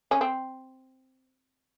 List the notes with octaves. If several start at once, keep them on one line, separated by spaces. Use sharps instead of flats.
C#4
C4